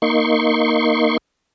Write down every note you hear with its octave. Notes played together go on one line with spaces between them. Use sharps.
A#3 D#4 C6 C#6